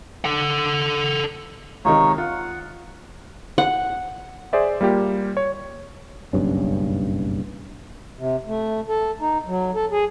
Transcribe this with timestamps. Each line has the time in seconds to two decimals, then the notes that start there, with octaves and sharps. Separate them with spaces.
0.25 A4 F#5
1.85 C#2 C3 D#3 D#4 C#5
2.18 F4 F#5
3.58 F#5
4.53 G#4 C5 D5 E5
4.81 G3 A#3 F4 G4
5.37 C#5
6.33 F#1 B1 G2 C#4
8.17 C3
8.47 A3
8.89 A4
9.20 D#4
9.47 F#3
9.75 A4
9.92 G#4